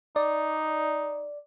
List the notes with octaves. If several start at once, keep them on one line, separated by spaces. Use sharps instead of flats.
D#4 D5